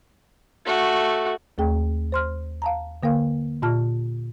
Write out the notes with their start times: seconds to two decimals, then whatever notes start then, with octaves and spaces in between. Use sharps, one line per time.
0.66 A3 F#4
1.58 D#2 A3 G#4 G5
2.12 C5 C6 F6
2.62 F5 A5 A#5
3.03 D3 A#3 A#4 F5
3.62 A#2 F4 A5 F6